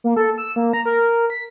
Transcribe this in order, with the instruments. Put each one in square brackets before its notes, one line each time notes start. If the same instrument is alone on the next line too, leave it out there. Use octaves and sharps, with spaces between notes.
[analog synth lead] A#3
A4
E6
A#3
A#5
A#4
B6